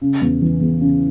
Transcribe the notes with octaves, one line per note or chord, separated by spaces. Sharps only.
C#3
E2
E3
E2
C#3